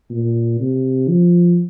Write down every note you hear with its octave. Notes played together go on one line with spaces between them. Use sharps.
A#2
C3
F3